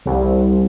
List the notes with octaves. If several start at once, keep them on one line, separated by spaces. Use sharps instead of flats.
C2